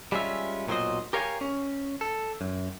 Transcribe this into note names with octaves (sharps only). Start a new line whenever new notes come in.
G3 G#3 C#4 F4 E5
B1 A#2 F#3 D4 C5 D#5
G4 A#4 C#5 F5 G5 G#5
C#4
A4
F#2